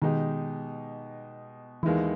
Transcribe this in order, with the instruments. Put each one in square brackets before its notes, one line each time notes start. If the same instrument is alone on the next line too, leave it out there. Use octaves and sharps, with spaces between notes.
[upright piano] B2 G#3 D#4 G4 [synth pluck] D#3
[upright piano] D#2 D#3 G#3 B3 E4 [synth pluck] E3